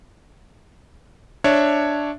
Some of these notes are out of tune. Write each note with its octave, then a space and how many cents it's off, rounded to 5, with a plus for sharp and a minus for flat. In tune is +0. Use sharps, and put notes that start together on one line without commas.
D4 +0 C#5 +0 E5 +0